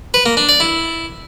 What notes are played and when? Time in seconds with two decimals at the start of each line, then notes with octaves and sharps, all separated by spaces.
0.14 B4
0.26 A#3
0.37 D4
0.49 D5
0.60 E4